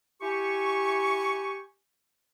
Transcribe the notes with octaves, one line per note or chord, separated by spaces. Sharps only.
E4 G4 G#5 C#6